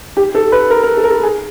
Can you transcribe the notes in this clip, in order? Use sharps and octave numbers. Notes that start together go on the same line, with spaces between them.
G4
A4
B4
A#4
A#4
A4
A#4
A4
G#4